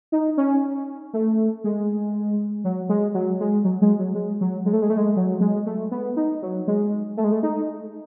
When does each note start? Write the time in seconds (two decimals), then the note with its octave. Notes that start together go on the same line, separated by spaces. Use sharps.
0.12 D#4
0.37 C#4
1.14 A3
1.64 G#3
2.64 F#3
2.89 G#3
3.14 F#3
3.40 G#3
3.65 F#3
3.82 G#3
3.99 F#3
4.15 G#3
4.41 F#3
4.66 G#3
4.73 A3
4.82 G#3
4.90 A3
4.97 G#3
5.16 F#3
5.41 G#3
5.66 A3
5.91 B3
6.16 D#4
6.42 F#3
6.68 G#3
7.17 A3
7.24 G#3
7.32 A3
7.43 D#4